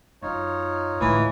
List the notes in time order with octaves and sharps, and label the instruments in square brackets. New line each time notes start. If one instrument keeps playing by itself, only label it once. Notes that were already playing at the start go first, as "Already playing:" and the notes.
[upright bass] F#2 [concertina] D#4 F4 C#5
[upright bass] D2 A2 [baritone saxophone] E3